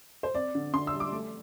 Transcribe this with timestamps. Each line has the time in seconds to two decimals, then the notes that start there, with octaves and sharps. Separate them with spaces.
0.23 C5
0.35 C4 D5
0.55 D3
0.73 D3 C6
0.87 E6
0.94 G3
1.00 D6
1.13 A3